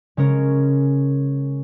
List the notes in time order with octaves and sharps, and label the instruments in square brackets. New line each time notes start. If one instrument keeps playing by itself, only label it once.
[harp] C#3 G#3 C#4 A#4